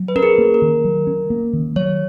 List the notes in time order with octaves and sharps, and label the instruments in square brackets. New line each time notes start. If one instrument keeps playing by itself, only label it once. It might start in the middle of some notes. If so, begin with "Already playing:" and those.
Already playing: [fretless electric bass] F#3
[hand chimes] B4
[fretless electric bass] C#4 [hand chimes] A#4
[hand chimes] G#4
[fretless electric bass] A#3
[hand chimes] A#4
[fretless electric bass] D#3
F#3
C#4
A#3
D#3
[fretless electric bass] F#3 [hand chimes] C#5